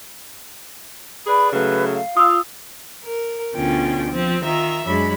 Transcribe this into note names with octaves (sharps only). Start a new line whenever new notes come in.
G#4 B4 D5 B5
C#3 F#3 A3 B4
F5
F4 D#6 E6
A#4
D2 B2 D3 C#4 F4 G5
F3 C4 F4
D#3 F4 E5 A#5
F#2 F#3 G#3 D4 B5